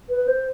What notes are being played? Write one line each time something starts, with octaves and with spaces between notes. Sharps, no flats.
B4
C5